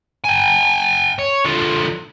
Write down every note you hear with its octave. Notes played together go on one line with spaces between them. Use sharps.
G5 G#5
C#5
D3 F3